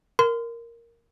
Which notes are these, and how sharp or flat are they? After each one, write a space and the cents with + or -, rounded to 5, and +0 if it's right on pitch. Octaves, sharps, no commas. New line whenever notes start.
A#4 +0 C6 -30